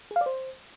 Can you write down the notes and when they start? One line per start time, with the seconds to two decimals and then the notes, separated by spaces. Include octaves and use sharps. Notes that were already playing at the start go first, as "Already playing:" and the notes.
0.11 G#4
0.16 F5
0.21 D5
0.26 C5